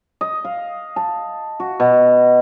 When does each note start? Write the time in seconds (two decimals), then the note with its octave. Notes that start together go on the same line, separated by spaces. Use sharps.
0.21 D#5
0.45 F5
0.96 A5
1.60 F#4
1.80 B2